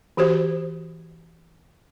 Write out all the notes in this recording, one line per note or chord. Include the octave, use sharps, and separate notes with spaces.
E3 F#4 G4 C5